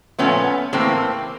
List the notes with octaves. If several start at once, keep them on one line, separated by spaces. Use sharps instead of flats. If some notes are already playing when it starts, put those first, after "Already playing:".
A#2 F3 A3 B3 C#4
A2 E3 A3 A#3 C4